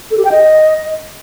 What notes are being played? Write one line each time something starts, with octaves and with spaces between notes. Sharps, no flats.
A4
G4
G5
D#5